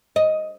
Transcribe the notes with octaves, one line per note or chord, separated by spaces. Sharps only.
D#5